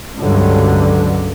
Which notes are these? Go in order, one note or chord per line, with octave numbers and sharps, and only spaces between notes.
C#2 G2 D3 F#3